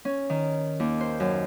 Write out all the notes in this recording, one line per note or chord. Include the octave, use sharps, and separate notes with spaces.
C#4
D#3
D#2
C5
F#2